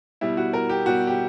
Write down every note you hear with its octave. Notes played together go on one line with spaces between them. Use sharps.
B2 G3 E4
F#4
A#4
G4
B2 G3 F#4
G4